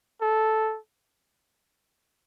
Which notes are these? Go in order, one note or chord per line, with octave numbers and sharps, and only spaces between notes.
A4